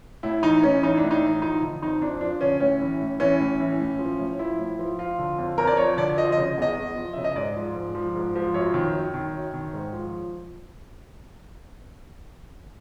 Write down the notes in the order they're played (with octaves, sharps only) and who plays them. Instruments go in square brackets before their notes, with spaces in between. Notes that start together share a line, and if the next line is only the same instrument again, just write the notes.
[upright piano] A2 E4
E3 D#4
A2 C#4
E3 D#4
D4
A2
D#4
E3
F3 D#4
D3
F2 D#4
F2 D4
F3 D4
D3 C#4
A2 C#4
E3
A2
E3 C#4
A2
E3
A2
F3
A2
F3 E4
A2
F3
F3 F4
D3
F2
F2 A#4
D5
F3 C#5
D3 D5
F3 D#5
C#3 D#5
E2 D#5
E2
F3
C#3 E5
D#5
G#2 D5
F3
G#2
F3
G#2
F3
F#2 C#5
D#3
F#2
D#3
F#2
D#3
G#2
F3